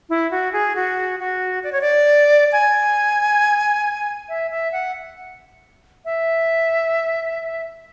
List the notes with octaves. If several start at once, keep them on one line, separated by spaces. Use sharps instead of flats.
E4
F#4
G#4
F#4
F#4
D5
C#5
D5
G#5
E5
E5
F#5
E5